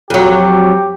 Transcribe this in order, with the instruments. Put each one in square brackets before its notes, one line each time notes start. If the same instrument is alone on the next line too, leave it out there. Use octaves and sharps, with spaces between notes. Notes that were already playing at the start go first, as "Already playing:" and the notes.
[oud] F2 F#3 [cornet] G4